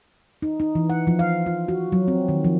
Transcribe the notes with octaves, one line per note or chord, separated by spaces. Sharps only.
D#4
D#4
E3
F#5
F3
F5
F4
F#4
F#3
C4
D#3
F3